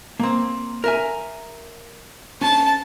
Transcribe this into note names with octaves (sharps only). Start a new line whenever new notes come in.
A#3 C4
A#4 E5 G#5
C#4 A5